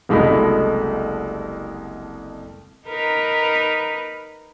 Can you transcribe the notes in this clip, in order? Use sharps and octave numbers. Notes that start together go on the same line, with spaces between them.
F#1 C2 G#3 A3 F#4 B5
D#4 A#4 B4